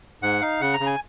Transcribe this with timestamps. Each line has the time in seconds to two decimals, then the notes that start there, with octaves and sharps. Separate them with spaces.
0.22 G#2 F#5
0.41 D#4 F5
0.61 C#3 F#5
0.74 A#5
0.80 C#3
0.87 G#5